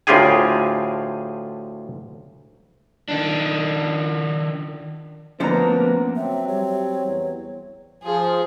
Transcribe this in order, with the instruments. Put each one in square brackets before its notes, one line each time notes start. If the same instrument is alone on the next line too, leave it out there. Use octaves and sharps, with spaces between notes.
[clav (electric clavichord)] D2 A2 F4 G4 G#4 G#5
[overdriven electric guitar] D#3 D4
[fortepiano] D2 A#5 [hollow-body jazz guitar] F3 C#4 C5 [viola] A#3 D4 [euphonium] B3
[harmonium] F#3 C4 [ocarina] E5
[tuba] G3 [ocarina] C#5
[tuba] E2
[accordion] F3 [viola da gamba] G#4